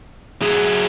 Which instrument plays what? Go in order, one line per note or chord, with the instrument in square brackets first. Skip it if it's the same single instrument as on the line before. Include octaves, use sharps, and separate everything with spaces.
[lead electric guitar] F#3 E4 [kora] G#4